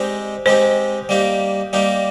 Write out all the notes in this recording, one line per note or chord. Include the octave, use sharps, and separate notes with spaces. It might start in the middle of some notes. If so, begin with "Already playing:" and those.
Already playing: G#3 C4 D#4 G4 D5
G#3 C4 D#4 G4 C5
G3 A#3 D#4 G4
G3 A#3 D#4 G4